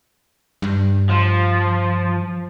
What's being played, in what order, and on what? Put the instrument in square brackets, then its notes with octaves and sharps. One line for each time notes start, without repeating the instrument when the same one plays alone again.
[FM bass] G2
[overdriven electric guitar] F3